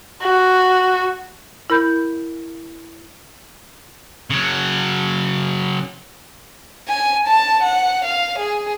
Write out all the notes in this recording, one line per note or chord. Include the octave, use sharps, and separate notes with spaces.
F#4
E4 A#4 B5 G6
C#3 F#3
G#5
A5
F#5
F5
G#4